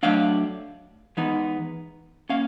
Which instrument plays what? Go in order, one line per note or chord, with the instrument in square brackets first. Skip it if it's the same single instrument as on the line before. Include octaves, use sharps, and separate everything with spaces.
[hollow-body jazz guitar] F#3 A3 D4 F5
E3 G#3 B3 D#4
A#3 C#4 F5